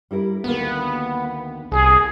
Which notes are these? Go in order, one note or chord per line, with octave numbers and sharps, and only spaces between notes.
G3 E4 A#4
D2 D#3 A#3 B3
C2 G#4